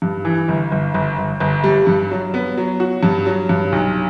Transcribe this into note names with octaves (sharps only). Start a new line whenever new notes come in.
G2
E3
G1
G1
G1
G1
G1
G3
G2
F#3
B3
F#3
F#4
G2
F#3
G2
B1